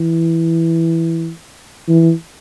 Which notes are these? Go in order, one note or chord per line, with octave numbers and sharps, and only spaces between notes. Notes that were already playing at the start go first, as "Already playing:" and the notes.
Already playing: E3
E3